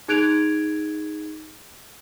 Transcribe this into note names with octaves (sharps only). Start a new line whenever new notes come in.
D#4 G#4 F#6 G#6 D7 F7